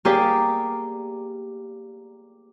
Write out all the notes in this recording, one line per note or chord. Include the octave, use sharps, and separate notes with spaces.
A#3 G4 G#4 D5 D6 B6